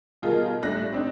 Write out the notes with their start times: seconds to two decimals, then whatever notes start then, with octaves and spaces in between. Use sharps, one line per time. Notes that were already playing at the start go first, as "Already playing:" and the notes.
0.22 B2 D#3 G3 F4 G#4 A#4
0.62 A2 G3 A3 D4 F#6 A#6
0.92 C4 D4 D#4